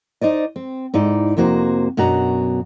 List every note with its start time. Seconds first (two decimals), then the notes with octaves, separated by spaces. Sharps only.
0.21 D#4 C5 D5 D#5
0.56 C4
0.94 G#2 D#4 E4 D5
1.37 F2 C3 A#3 F#4 C5
1.97 F#2 B2 D4 F#4 A#5